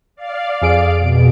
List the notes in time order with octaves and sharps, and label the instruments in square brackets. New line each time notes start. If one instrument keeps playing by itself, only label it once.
[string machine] D5 F5
[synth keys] F2 G#4 D7
[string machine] B2